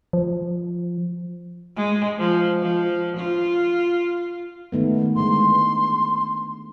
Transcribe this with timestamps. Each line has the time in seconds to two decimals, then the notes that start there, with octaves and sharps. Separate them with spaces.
0.13 F3
1.77 G#3
2.19 F3
2.62 F3
3.17 F4
4.72 D#3 A3 B3
5.16 D3 E3 G#3 C6